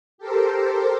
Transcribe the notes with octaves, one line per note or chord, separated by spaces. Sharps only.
G4 A4 A#4 C5